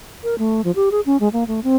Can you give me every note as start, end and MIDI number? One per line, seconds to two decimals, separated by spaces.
0.24 0.35 70
0.38 0.64 57
0.64 0.71 53
0.76 0.89 67
0.92 1.01 68
1.06 1.17 61
1.20 1.29 56
1.33 1.44 58
1.47 1.60 57
1.64 1.76 60